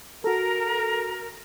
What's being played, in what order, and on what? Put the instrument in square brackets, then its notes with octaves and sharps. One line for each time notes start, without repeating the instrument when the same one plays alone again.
[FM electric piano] F#4 A4 [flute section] A#4